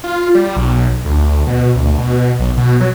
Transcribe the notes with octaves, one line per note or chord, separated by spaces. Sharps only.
F4
G3
B1
D2
B2
D2
B2
B1
B2
F#3